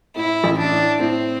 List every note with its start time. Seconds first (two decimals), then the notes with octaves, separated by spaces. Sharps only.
0.16 A2 E4
0.44 A1
0.58 D4
0.72 A2
1.00 A2 C4